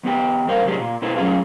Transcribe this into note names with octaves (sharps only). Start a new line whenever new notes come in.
E2 B3 G4 G5
G2 A#4 C5 F5
F#2 A2 C3 D4 G4 G#4
A#2 F4
B2 E4 A4 B4 C5
F#3 A3 C#4 F4 G#4 F5